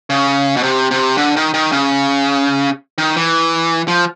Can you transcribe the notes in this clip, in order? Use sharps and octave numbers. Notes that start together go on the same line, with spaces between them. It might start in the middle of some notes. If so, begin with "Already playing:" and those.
C#3
B2
C3
C3
D3
D#3
D#3
C#3
D#3
E3
F3